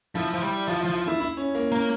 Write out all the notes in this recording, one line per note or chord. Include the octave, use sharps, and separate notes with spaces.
F3 E4
F3
G3
F3 F4
F4
F3
F4
E4
E4
C#4
A#3
A#3 C#4